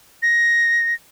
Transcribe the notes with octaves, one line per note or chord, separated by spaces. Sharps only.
A#6